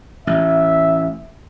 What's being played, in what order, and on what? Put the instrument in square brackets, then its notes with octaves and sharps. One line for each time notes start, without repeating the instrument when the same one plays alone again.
[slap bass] A1 [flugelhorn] E5